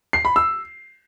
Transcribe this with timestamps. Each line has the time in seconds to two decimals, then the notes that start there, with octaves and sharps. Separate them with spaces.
0.13 C7
0.25 B5
0.36 E6